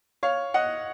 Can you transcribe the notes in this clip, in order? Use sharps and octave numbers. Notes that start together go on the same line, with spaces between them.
C#5 F5
D#5 F#5